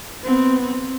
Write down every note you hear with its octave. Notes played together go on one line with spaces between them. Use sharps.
B3 C4
C4